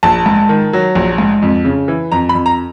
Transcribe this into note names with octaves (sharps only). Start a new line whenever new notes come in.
A#1 A5
G#2
D#3
F#3
A#1
G#2
F2
C#3
E3
F2 A#5
B5
F2
A#5